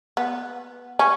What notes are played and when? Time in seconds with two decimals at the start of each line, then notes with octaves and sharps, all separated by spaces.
0.17 B3
0.99 C#4